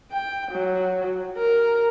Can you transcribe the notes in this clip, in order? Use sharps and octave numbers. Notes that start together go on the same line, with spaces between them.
G5
F#3
A#4